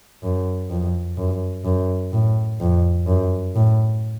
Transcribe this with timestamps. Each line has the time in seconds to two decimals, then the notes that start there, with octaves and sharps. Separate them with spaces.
0.23 F#2
0.70 F2
1.17 F#2
1.65 F#2
2.13 A2
2.60 F2
3.07 F#2
3.55 A2